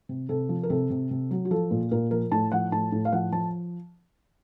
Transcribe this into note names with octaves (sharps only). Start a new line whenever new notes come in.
C3
C3 A4
F3
A#4
C3 A4
C3
C3
F#3
F#4
F3 A4
A#2
A#2 A#4
F3 A#4
A2 A5
F3 F#5
A2 A5
A2
F5
F3 F#5
F3 A5